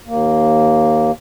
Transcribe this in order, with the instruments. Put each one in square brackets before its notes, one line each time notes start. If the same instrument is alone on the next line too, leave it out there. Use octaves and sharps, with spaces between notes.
[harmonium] D#2 A#3